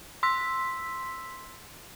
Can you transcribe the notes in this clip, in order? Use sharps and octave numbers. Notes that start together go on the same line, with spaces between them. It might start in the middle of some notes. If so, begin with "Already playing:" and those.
C6 E6 B6